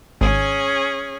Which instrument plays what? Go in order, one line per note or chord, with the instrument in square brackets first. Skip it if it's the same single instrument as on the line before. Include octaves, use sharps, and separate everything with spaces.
[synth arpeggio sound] G#1 [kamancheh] C#4 G#4